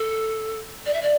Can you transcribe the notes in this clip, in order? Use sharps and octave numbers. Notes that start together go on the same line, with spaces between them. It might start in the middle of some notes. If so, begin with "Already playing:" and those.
Already playing: A4
D5
E5
D5